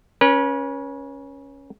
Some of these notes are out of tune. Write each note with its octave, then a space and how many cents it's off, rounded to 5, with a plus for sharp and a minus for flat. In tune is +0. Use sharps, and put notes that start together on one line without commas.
C#4 +0 B4 -40